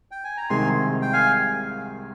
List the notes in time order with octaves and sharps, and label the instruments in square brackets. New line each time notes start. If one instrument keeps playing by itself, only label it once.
[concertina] G5
G#5
A#5
[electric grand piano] C2 C3 D#3 G#3 [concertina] G#5 C6
[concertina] G5
F5 G#5